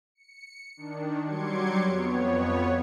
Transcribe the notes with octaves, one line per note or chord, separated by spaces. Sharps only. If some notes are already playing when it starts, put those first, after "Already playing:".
C#7
D#3 D4
F#3 G3 C6 D6 G#6 C#7
F2 B3 C#5